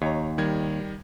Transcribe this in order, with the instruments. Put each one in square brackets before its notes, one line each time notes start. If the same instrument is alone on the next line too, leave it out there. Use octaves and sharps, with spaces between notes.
[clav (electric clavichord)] D#2 [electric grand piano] C#5 A#5
[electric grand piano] D#3 G3 G#6